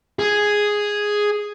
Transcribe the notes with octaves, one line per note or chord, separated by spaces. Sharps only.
G#4